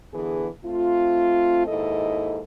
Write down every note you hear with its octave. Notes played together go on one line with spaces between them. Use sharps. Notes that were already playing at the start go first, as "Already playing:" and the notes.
D3 E3 B3 G#4
A3 C4 F4
D#2 G#2 E4 A4 D#5